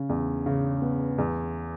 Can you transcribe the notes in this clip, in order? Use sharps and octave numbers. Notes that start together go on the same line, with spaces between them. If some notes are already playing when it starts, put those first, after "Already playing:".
Already playing: C#3
E2
C#3
B3
E2